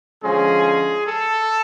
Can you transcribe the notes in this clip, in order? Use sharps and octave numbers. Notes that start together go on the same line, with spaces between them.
D3 F3 G#3 C#4 G#4
A4